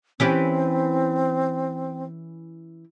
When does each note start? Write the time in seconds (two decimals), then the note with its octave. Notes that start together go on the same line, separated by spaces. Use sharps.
0.20 E3 C4 C#4 G4